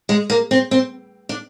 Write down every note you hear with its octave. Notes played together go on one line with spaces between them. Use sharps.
G#3
A#3
C4
C4
D4